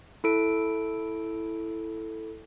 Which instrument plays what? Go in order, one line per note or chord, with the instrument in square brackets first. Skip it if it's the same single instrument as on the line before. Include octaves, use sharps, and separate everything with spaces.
[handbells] E4 A4 D7